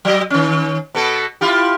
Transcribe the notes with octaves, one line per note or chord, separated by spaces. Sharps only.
F#3 D#5
D#3 C#4
B2 B3 A4
E4 F4 G4